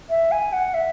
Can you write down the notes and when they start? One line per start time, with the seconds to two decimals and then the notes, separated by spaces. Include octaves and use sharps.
0.10 E5
0.32 G#5
0.53 F#5
0.74 E5